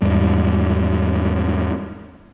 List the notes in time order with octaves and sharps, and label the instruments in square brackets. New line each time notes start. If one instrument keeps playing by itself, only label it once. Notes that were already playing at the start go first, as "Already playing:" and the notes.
[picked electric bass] E2 G#2 G3